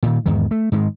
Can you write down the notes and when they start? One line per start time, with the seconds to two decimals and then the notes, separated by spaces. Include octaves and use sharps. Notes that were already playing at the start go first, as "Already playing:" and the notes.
0.03 A#2 D#3
0.26 E2 G#2 D#3
0.51 A3
0.72 G#2 D#3 F3 G#3